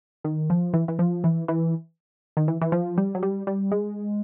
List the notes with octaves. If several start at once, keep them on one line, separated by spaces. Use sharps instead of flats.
D#3
F3
E3
E3
F3
E3
E3
D#3
E3
E3
F3
G3
F#3
G3
G3
G#3